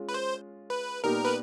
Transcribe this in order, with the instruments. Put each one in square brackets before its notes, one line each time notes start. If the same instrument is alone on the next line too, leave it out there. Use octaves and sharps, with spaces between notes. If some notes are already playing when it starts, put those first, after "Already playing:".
Already playing: [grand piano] G#3 C#4 F4
[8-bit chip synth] B4
C5
B4
[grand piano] A#2 G3 B3 D#4 G4 [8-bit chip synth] A#4
[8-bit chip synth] B4